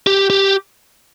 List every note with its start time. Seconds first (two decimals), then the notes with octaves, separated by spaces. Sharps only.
0.07 G4
0.30 G4